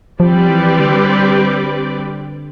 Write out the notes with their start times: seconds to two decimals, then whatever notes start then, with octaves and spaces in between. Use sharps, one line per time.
0.20 F3 G3 C4 G4 B4 D5
0.49 E3
0.80 D3